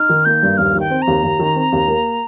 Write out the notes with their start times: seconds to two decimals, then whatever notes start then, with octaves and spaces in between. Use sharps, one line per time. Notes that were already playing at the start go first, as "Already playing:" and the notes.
Already playing: D#4 F6
0.09 D#3
0.25 A#3 G6
0.42 G2
0.57 D#2 F6
0.74 D#3
0.80 G5
0.91 C4
1.02 A#5
1.07 D#2
1.23 D#2
1.39 D#3
1.56 C4
1.72 D#2
1.88 A#3